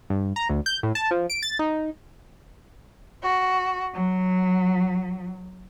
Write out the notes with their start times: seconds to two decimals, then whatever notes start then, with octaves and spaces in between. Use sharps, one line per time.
0.10 G2
0.36 A#5
0.49 D2
0.66 G6
0.83 A2
0.95 A5
1.11 F3
1.30 D7
1.43 A6
1.59 D#4
3.23 F#4
3.94 F#3